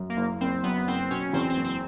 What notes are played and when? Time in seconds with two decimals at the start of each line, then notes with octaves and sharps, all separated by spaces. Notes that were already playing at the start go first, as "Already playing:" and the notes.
Already playing: F#2
0.10 A#3
0.17 F#1
0.41 F#1 C4
0.63 F#2 B3
0.87 F#1 C4
1.11 B2 C#4
1.33 E2 C4
1.50 C4
1.57 F#1
1.65 C4